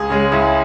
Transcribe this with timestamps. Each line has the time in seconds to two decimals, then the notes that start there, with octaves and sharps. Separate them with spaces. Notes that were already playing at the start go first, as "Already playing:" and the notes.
Already playing: C#2 G#4
0.10 C#3 G#3
0.32 C#2 E4